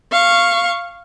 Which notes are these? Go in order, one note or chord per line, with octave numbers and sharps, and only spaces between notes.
F5 C#6